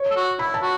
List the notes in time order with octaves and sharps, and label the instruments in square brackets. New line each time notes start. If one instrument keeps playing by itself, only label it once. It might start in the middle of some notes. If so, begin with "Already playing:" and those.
Already playing: [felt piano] C#5
[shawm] A4
F#4
[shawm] E4 [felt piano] B5
[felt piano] A5
[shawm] F#4